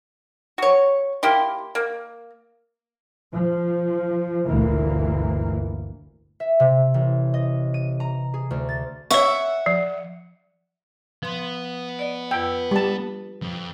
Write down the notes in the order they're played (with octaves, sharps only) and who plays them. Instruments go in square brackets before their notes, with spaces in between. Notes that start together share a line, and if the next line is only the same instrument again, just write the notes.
[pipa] F#4 C#5
A#3 E4 G4 C6
A#3
[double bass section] F3
G1 D2 A#2 E3 A#3
[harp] E5
C3
A1
D#5
D#7
A#5
G#4
D2
A6
[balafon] C#5 C#6 [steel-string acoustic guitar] E5 F#5
[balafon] F3
[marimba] F3 C6 [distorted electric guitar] B3
[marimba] D5 D#5
[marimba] F2 B4 E6 [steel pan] G5
[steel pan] G3 A5
[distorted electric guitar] F2